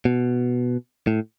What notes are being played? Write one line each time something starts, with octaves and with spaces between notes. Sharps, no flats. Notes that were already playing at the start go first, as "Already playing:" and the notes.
B2
A2